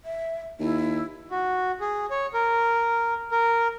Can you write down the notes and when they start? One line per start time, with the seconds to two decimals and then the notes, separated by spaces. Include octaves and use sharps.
0.05 E5
0.60 D#2 E4
1.31 F#4
1.80 G#4
2.10 C#5
2.34 A#4
3.31 A#4